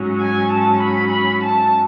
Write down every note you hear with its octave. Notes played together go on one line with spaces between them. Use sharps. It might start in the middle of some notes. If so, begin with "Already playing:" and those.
Already playing: G#2 F#3 C#4
G#5
A5
B5
B5
A5